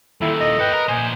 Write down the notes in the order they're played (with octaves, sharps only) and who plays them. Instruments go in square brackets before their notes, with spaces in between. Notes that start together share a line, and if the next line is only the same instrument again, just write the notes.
[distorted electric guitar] A#2 D#3 [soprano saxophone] E4 [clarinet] A4
[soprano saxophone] D#5
[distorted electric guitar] A4 G5 [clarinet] B4
[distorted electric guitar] A#4
[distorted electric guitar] A#2 C5 [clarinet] G#5